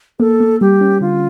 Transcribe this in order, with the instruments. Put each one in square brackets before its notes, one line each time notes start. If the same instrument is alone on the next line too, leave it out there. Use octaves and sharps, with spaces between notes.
[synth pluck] A#3 [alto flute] A4
[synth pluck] A#3
[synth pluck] G3 [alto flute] G4
[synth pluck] C#4
[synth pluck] D3 [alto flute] F4